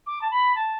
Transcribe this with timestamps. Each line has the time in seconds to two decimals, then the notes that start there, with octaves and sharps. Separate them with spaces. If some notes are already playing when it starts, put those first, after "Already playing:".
0.07 D6
0.22 A5
0.31 B5
0.55 A5